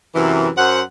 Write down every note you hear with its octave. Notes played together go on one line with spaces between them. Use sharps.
F#2 C3 E3
F#2 C5 F#5